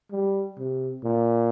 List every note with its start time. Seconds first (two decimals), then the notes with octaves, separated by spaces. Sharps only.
0.12 G3
0.58 C3
1.04 A#2